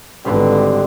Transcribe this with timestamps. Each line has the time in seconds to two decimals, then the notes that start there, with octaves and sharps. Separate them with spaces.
0.25 G#1 D3 G3 B4 C5